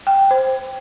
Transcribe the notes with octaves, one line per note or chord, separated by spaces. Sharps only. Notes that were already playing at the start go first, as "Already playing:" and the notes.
G5
C5